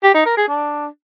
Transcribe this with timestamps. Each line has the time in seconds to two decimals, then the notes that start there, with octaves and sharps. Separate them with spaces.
0.03 G4
0.15 D#4
0.26 A#4
0.37 G#4
0.48 D4